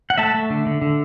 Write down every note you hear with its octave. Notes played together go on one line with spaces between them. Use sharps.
F#5
A3 E5 A5
A3
D3
D3
D3